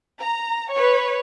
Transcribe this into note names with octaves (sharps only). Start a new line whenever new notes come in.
A#5
B4 C#5